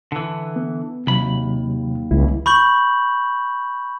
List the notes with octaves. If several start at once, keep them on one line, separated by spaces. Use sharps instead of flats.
D3 E3
B3
D#2 C3 F#3 B5
C#2 G3 E4
B5 C#6 G6 F#7